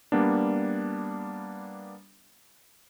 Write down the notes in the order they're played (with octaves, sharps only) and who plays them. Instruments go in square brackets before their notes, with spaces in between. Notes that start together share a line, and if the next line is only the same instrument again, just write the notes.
[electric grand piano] G3 A#3 B3 D4